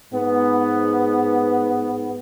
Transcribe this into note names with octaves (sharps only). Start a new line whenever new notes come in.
G#2 B3